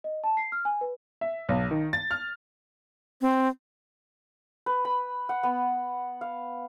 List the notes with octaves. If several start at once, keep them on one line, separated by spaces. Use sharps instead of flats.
D#5
A5
C7
F6
G#5
B4
E5
B1
D#3
A6
F6
C4
B4
B5
F#5
B3
F5